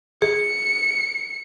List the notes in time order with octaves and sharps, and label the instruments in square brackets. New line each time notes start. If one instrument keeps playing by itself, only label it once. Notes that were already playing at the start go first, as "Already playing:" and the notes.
[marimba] G#4 [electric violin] C#7